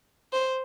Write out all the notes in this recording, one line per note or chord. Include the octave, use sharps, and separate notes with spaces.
C5